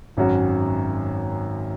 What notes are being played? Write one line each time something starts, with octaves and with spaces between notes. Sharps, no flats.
G#1 F#2 F#3 C#4 F#4